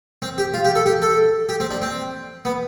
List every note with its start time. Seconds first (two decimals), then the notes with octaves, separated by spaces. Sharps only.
0.22 C4
0.38 G4
0.54 F4
0.65 G4
0.75 A4
0.86 G4
1.02 A4
1.49 G4
1.60 C4
1.71 D4
1.82 C4
2.45 B3